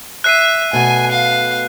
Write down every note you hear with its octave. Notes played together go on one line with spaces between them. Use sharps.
E5 F#6 C7 D#7
B2 A3 F#5 G#5
F5